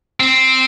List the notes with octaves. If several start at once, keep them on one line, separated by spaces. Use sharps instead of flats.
C4